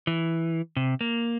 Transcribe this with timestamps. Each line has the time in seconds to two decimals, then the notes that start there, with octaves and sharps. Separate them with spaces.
0.07 E3
0.77 C3
1.01 A#3